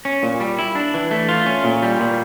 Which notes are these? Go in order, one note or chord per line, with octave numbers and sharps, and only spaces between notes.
C#4
A#2
G3
E4
D4
E3
A3
F4
C#4
A#2
G3
A#2